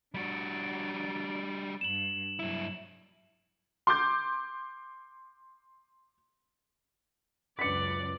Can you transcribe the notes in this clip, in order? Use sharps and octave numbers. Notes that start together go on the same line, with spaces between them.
G3 D4 F#4 D5
G2 E7 F#7
G2 F#3 E4
C6 D6 G6
C#2 F#2 B4 D5 B6 C#7